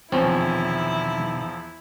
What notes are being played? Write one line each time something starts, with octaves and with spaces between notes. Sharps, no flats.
E2 B2 D#3 F3 C4 C#4 E4